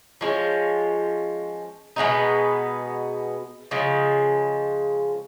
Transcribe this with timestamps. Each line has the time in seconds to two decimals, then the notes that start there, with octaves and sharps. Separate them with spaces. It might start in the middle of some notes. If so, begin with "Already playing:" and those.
0.21 F3 G#3 C#4
1.96 B2 G#3 B3 D#4
3.71 C#3 F3 G#3